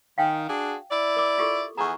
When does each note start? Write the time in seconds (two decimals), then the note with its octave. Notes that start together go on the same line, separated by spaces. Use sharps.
0.18 D#3 F5 G5 G#5
0.48 D4 F#4 G#4
0.91 E4 D5
1.16 A#4 D6
1.38 F4 G4 A4
1.77 E2 B3 G#4 A#5 C#6